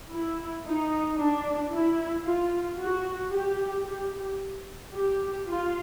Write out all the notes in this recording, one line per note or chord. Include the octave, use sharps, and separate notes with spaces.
E4
D#4
D4
E4
F4
F#4
G4
G4
G4
F4